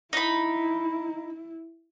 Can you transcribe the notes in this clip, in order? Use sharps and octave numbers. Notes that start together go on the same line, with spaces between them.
D#4 E4 B5